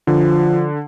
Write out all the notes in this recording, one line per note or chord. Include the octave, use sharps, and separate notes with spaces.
D3 F3